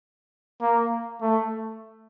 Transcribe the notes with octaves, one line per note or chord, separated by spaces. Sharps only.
A#3
A3